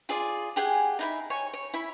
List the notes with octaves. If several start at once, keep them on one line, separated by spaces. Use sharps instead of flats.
F4 G#4 D5
G4 G#4 F#5 G#5
D#4 E4 B5
C#5 G#5 C#6
C#5
E4 B5